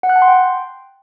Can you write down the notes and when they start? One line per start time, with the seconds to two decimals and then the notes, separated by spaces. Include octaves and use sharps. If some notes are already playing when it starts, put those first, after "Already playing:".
0.03 F#5
0.09 F#6
0.16 A5
0.22 C6
0.28 G5